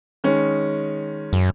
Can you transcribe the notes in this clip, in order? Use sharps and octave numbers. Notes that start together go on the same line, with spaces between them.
D#3 G#3 C#4
F#2